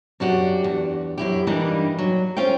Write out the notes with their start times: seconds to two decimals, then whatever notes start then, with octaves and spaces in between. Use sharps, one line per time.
0.20 F#2 D4 F#4 G4
0.64 E2
1.18 F#2 E4 G4
1.47 G2 E3 G3 A#3 D4 D#4
1.99 F#3
2.37 C#4 F4 C5 G5